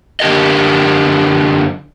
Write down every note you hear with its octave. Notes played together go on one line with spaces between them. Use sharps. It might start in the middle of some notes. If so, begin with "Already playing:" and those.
F#2 D3 G4 A#4 D#5